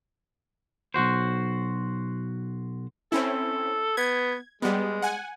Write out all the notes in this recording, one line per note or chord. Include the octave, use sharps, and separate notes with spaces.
B1 F#2 F#4 C5
C4 C#4 E4 A4
B3 G#6
G3 G#3 B3
F#5 G#5